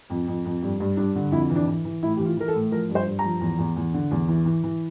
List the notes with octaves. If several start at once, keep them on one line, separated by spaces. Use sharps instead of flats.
F2
F2
F2
G2
G2
G2 D4
D3
F2 E4
E3
D4
E3
E3
A2 E4
E3 G4
F4
E3 A#4
A4
A2
F3 A#4
G2
C5
G2
F3 A#5
E2
E2
E2
D3
E2
E3
E3
E3